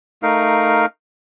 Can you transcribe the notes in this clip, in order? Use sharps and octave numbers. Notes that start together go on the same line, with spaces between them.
A3 D#4 A#4 F5